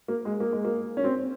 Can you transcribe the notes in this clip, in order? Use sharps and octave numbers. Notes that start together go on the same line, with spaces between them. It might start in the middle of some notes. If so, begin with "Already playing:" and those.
A#3
G#3
A#3
G#3
A#3
C#4
C4